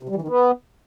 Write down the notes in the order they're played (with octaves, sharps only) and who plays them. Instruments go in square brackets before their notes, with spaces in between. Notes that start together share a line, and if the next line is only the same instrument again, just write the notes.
[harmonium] C3
G3
E3
D#3
B3